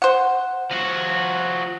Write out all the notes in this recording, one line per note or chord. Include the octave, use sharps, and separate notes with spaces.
C5 F#5
F3 F#4